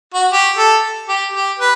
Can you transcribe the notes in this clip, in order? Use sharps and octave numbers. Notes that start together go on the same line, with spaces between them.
F#4
G4
A4
G4
G4
B4